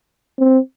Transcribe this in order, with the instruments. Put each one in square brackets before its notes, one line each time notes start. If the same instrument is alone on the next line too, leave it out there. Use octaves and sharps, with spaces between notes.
[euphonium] C4